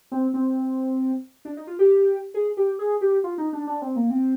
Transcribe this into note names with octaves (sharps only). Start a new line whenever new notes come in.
C4
C4
D4
D#4
F4
G4
G#4
G4
G#4
G4
F4
D#4
D4
D4
C4
A#3
C4